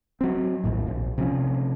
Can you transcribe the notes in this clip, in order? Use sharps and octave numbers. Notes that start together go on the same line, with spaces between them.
F#3 C4
A#1 D#2 A2
A#1
C3 F3 C#4